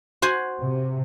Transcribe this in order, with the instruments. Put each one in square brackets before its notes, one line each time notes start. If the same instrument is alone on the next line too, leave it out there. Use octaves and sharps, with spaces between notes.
[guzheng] F#4 C5 G#5
[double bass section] C3